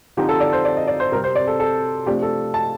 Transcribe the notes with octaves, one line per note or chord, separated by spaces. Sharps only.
D3 F3 C4 D#4 G4
A4
D5
C5
D5
D#5
D5
C5
C3 G3 C4 A#4
C5
D5
A4
A4
C3 F3 A3 D4 G4
A4
A5